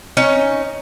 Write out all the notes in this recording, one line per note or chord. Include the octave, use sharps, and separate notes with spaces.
C#4 D#4 C#5